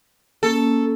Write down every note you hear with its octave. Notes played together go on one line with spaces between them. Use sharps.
A#3 C#4 A4